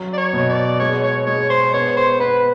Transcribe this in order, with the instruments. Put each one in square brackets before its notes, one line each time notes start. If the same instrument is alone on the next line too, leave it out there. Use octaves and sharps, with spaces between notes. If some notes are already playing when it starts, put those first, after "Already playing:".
Already playing: [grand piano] F#3
[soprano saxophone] D5
C#5
[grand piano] B2
[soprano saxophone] D5
[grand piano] G#3 [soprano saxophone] C#5
[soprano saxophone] C#5
[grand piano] G#3 [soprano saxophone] C#5
[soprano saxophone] C5
[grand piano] B3 [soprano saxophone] C#5
[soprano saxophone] C5
[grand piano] B3 [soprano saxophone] B4